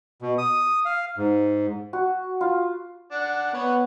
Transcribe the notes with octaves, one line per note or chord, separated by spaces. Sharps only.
B2
D#6
F5
G#2
F#4
F4
D4 F#5
B3 B4 C#5 F#5